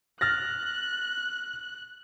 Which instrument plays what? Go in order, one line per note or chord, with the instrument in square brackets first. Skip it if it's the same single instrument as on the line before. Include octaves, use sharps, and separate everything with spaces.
[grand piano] F6 A6 A#6 [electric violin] F#6